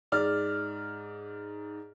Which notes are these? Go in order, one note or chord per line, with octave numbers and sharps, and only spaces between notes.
G#2 D5 F6